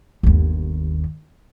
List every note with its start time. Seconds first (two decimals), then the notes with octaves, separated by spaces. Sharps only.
0.23 G1 D#2